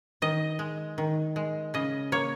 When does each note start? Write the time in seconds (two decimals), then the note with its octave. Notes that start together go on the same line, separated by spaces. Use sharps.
0.22 D#3 D#5
0.59 G#3
0.98 D#3
1.36 G#3
1.74 C#3 D#5
2.12 A#3 C#5